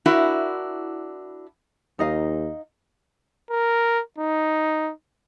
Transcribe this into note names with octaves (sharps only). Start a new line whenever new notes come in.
D4 E4 F#4 A#4
D#2 D#4 D#5 F5
A#4
D#4